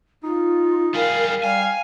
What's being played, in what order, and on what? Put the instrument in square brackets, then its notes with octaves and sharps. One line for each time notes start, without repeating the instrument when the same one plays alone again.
[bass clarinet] D#4 [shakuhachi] F4
[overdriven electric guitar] G3 G#4 [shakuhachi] A#4 [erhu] F5
[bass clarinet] G3 [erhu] F5 [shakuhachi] G5 [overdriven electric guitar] G#5